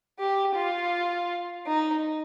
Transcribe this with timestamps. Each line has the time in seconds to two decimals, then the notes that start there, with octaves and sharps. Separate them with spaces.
0.19 G4
0.55 F4
1.67 D#4